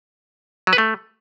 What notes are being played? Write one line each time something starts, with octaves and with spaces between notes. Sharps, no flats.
F#3
B4
A3